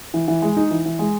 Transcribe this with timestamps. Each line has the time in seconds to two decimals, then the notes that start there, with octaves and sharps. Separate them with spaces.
0.14 E3
0.28 E3
0.42 G#3
0.57 D#4
0.71 E3
0.85 E3
0.99 G#3